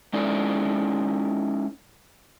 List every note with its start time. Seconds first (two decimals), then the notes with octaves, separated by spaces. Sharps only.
0.13 G#3 C#4 D#4 E4 A4 D5